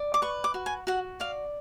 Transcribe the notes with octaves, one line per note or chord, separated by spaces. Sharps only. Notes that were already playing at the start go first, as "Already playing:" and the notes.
Already playing: D5
D6
B4 C#6
D6
F#4
G#5
F#4 F#5
D5 F5